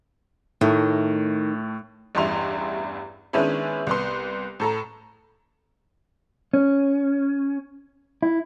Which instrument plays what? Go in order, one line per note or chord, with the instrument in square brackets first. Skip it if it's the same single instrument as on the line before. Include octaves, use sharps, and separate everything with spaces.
[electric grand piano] A2 A3 [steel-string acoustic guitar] D#3
[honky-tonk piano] A1 E2 G2 E4 C6 F7
D#3 G#3 B3 C#4 D4 E4
C2 B3 C6
A2 A4 A#5
[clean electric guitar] C#4
E4